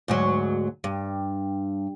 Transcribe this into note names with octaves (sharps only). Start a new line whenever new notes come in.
D2 G#2 F#3
G2